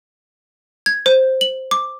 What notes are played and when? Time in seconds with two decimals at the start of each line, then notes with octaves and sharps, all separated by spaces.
0.86 G#6
1.06 C5
1.41 F#7
1.71 D6